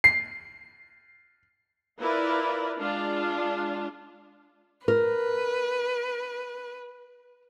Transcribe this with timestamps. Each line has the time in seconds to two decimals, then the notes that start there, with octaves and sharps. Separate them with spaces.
0.04 C7
1.98 E4 F4 A#4 B4 D5
2.78 G#3 D4 F4
4.88 A#4 B4